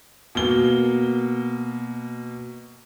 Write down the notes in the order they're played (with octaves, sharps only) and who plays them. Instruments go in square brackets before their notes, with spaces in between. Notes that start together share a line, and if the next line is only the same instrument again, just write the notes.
[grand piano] B2 A#3 G7